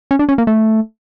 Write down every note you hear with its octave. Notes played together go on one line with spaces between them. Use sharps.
C#4
D4
C#4
A#3
A3